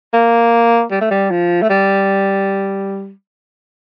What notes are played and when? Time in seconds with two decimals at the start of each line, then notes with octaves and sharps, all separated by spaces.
0.13 A#3
0.91 G3
1.01 A3
1.11 G3
1.30 F3
1.62 A3
1.69 G3